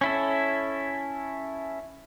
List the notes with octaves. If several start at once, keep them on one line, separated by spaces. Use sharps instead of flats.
C#4 E4 A4